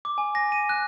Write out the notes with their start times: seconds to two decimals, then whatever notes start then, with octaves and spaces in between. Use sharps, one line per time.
0.05 D6
0.18 G#5
0.35 A#6
0.52 D#7
0.69 F#6